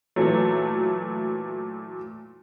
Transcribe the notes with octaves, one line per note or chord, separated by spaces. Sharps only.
A#2 E3 F#3 A3